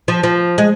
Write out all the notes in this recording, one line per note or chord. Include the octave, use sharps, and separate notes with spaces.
F3
F3
G#3